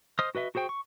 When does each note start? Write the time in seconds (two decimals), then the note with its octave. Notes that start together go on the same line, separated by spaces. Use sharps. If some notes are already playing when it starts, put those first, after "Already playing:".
0.19 C5 D#5 D#6 F6
0.35 F#4 B4 D#5 E5
0.55 F#4 G#4 C5 G5 C#6
0.69 C#6